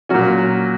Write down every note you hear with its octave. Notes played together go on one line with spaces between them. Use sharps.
A#2 F#3 C#4 F#4